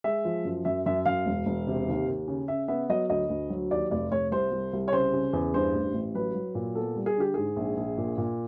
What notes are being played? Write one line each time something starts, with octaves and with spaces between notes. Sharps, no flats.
G#3 E5
F3
F#2
F#2 E5
F#2 E5
F#2 F5
E1
E1
C3
D#2
D#2
C#3
C#3 E5
B3 E5
F#3 D#5
D2 D#5
D2
F#3
D#2 D5
F1 D5
F1 C#5
C2 C5
C2
C2
C#5
C#3 C5
C#3
E2
G2 C5
A1
A1
F#3 B4
F#3
A#2
B3 A4
G3
G#4
D3 G4
G#2 G#4
A#1
A#1
A#2
A#2